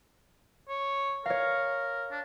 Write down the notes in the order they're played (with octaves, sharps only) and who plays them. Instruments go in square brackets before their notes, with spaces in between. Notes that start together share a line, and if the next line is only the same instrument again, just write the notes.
[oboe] C#5
[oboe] A#4 [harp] C#5 F5
[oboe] D4